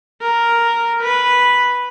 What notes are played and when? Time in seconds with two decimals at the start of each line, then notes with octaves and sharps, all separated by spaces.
0.22 A#4
1.03 B4